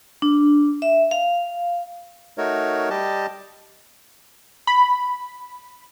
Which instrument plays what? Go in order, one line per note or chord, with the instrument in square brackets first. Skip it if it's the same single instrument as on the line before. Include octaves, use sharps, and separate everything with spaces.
[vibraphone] D4
E5
F5
[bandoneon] A3 D#4 F#4 A#4 C#5
G3 G4 D#5 A5
[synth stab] B5